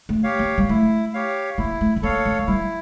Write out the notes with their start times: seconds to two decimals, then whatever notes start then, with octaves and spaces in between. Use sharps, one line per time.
0.09 A3
0.23 G4 C#5 F5
0.39 A#3
0.58 G3
0.69 A3 E4
1.14 G4 C#5 F5
1.58 A#3 E4
1.81 A3
1.96 A3
2.02 A#3 A4 C#5 F5
2.25 A3
2.38 A3
2.47 G3 E4